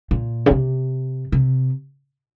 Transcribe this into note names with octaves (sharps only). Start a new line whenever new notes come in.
A#2
C#3
C3
C3